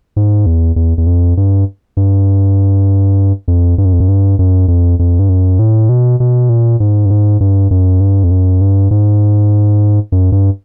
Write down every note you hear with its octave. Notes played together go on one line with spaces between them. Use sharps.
G#2
E2
E2
E2
F2
G2
G2
F2
G2
F#2
F2
F#2
G2
F#2
F2
F2
G2
F#2
A2
B2
B2
A#2
G#2
G2
G#2
G2
F#2
G2
F2
F#2
G2
G#2
F#2
G2